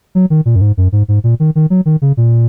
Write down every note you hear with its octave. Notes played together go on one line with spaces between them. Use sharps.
F#3
D#3
A#2
F#2
G#2
F#2
G#2
G#2
A#2
D#3
D#3
F#3
D#3
C#3
A#2